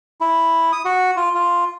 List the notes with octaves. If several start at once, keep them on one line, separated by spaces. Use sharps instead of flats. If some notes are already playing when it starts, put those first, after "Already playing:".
E4
D#6
F#4
F4
F4